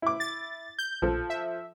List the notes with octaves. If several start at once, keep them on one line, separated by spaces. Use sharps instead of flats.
E4 D6
A6
G6
A#1 F3 A4
E5